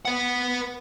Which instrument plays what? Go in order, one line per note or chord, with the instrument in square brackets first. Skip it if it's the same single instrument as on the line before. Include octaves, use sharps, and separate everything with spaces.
[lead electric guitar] B4 F#5